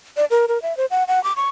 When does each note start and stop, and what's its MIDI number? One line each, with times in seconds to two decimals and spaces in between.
0.17 0.25 74
0.31 0.46 70
0.48 0.61 70
0.62 0.76 76
0.77 0.86 72
0.91 1.04 78
1.08 1.22 78
1.24 1.33 86
1.36 1.49 85